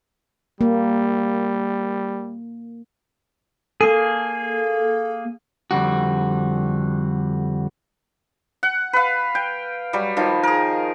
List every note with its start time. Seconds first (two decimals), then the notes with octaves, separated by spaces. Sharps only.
0.61 G3 A#3
3.81 A#3 G#4 A4
5.71 F2 D3 G3 F#4
8.63 F#5
8.93 B4 F5
9.35 G5
9.93 F#3 G3
10.17 D#3 F3
10.43 G#4 A#4